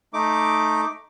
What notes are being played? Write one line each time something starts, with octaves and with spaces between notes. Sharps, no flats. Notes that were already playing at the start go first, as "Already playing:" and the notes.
A3 D#4 D6